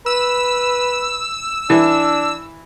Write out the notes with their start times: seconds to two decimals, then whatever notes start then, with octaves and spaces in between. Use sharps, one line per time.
0.06 B4 E6
1.70 E3 D4